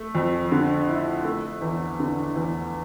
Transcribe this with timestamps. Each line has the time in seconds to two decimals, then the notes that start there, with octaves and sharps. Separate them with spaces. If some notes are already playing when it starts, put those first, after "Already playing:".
Already playing: A3
0.15 F2
0.52 D3
0.89 E4
1.24 A3
1.61 E2
1.99 D3
2.36 E2